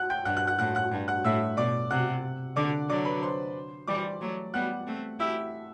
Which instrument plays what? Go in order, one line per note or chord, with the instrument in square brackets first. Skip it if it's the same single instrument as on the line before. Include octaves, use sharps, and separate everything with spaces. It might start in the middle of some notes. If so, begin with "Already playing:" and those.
Already playing: [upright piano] F#5 F#6
G5 G6
[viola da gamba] G2 [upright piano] F#5 F#6
[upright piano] F#5 F#6
F#5 F#6
[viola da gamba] A2 [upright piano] F#5 F#6
[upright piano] F#5 F#6
[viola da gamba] G2
[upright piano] F#5 F#6
[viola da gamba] A2 [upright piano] E5 E6
[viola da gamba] B2 [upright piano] D5 D6
[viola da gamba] C3 [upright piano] F#5 F#6
[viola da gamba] D3 [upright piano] D5 D6
[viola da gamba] D3 F#3 [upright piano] D5 D6
[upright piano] B4 B5
C5 C6
[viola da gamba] E3 G3 [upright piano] D5 D6
[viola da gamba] F#3 A3
[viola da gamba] G3 B3 [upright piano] F#5 F#6
[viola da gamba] A3 C4
[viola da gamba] E4 G4 [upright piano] E5 E6